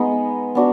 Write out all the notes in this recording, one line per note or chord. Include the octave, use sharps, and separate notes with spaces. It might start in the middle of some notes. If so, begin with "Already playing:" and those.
Already playing: G#3 B3 D#4 D#5
B3 D4 F#4